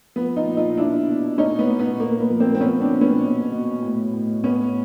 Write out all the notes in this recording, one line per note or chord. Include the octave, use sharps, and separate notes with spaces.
F3 B3
D#4 F4
A#2
D#4 F4
B2 D4 E4
B2
A#2 C#4 D#4
B3
A#2
B3
A#2 A#3
B3
F3
A#3 C4
C4
A#2 B3 C#4
C4 D4
A#2
B3 C#4
B2
B2
A2
A2
A2 B3 C#4